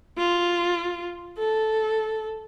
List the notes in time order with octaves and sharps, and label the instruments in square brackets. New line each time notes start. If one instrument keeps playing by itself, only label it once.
[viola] F4
A4